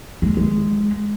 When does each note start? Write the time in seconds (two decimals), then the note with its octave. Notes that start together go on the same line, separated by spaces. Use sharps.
0.22 G#3
0.37 G#3